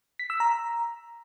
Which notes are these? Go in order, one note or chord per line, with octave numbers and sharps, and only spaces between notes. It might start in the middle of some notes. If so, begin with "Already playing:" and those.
B6
E6
A#5